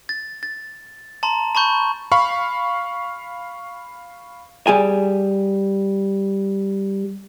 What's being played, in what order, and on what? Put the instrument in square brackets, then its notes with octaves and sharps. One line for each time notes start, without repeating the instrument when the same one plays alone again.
[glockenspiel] A6
A6
A5 A#5 C6
A5 B5 C#6 G6
[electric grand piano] F5 B5 C#6
[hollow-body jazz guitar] G3 G#4 G#5